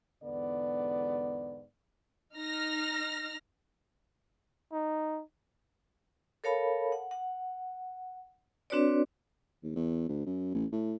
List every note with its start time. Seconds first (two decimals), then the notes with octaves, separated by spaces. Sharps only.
0.22 E2 G#2 D3 B3 D5
2.35 D#4 F6 A#6
4.72 D#4
6.44 A4 A#4 C#5 F5 A5 B5
6.92 F#5
7.11 F#5
8.70 C4 D4 F#4 B4 C#5 D5
9.63 D#2
9.76 E2
10.09 D2
10.26 F#2
10.54 A1
10.72 A2